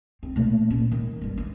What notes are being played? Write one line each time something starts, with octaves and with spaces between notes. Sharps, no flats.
C4
A#2 A3
C#4
D#3
G1 G3
D4